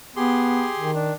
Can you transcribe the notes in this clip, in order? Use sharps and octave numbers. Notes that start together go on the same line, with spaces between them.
B3 G4 G#4 C6
D#3
D4